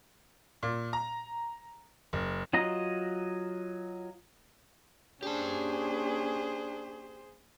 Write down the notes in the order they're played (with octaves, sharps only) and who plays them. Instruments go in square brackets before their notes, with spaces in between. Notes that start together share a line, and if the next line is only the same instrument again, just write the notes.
[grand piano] A#2
A#5
F#1
[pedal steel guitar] F#3 F4 D#5 A#5
[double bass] A#3 C#4 [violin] D4 [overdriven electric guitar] G4 A5 [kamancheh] G#4 C5